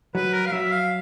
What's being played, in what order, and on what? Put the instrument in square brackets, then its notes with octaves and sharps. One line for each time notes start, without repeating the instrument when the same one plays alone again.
[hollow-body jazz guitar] F#3 [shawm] B4
[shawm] A#4
F5
[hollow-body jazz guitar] F#3 [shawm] E5
[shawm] F5